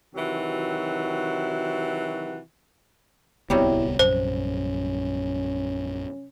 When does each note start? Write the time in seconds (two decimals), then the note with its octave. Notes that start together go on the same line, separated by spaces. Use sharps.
0.15 C3 D#3 E3 F#3 F#4
3.50 D1 C2 C3 F#3 G3 B3 E4
3.99 A#1 F#2 C#4 C5